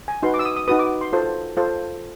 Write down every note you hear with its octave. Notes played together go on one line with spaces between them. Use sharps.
G#5
D#4 F#4 B4 C6
D6
E6
D#6
D#6
D#4 F#4 B4 D#6
D6
C6
F4 A4 C5
F4 A4 C5